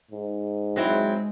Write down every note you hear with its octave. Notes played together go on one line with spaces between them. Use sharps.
G#2
F#3 G#3 C4 E4